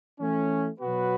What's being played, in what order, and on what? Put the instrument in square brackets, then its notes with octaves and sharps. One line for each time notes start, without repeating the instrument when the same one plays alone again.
[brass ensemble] E3 A3 C#4
B2 F#3 B3 F#4 B4